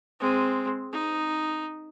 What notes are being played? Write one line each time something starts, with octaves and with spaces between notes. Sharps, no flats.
G#3 C4
D#4